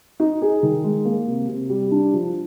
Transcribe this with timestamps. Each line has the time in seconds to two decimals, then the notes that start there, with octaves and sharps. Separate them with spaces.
0.20 D#4
0.42 G#4
0.63 D#3
0.84 G#3
1.05 A#3
1.27 C3
1.48 C3
1.70 G3
1.91 D4
2.14 F3